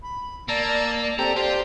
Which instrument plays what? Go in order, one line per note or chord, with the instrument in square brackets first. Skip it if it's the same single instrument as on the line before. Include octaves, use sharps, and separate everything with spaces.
[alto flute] B5
[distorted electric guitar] A#3 [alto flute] D5 [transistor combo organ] A5 A#5 E6
[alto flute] D5
D5
[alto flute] C4 [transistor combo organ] G4 A4 [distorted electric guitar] A#5
[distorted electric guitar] F4 [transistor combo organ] G4 C5 [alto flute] D5